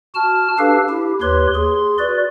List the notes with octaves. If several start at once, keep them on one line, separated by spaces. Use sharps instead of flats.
F#4 A5 F6
D4 G4 A4 B4 F5
E4 G4
D#2 G4 B4 C#5 C6
G#4 C6
F#4 B4 D5